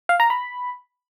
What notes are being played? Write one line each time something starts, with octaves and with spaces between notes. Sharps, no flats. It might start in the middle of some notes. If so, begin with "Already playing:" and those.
F5
A#5
B5